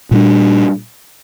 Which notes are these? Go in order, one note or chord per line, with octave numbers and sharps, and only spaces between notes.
A#2 G3 D4